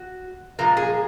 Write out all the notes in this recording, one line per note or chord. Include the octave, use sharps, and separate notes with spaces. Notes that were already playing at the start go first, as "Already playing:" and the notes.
Already playing: F#4
A#2 F3 G#3 A#4
G#4